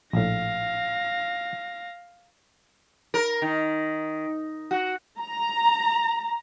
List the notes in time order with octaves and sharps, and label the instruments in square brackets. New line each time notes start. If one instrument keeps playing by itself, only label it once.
[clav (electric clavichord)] A#1 A2 [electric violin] F5 A#6
[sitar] A#4
D#3
F#4
[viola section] A#5